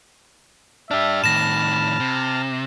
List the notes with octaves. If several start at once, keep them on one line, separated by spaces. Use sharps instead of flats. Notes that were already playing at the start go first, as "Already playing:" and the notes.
D4 G4 E5 A5 F6
A2 D#3 B5 A#6 E7
C3